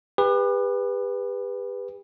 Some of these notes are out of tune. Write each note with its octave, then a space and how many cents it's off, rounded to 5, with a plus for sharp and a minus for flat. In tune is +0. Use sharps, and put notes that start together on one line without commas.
G4 +40 B4 +0